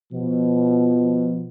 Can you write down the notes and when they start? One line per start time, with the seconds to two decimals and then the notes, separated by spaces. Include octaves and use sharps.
0.13 B2 F3